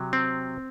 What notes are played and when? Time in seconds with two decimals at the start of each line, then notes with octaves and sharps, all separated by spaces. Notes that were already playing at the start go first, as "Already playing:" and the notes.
Already playing: C3 F#3
0.13 C4